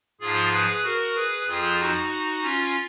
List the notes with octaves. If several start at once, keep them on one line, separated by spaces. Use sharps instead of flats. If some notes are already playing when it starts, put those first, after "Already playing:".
G#2 F3 F4 G#4
G#4 B4
F#4 A#4
G#4 B4
F2 F3 F4 G#4
D#4 F#4
C#4 F4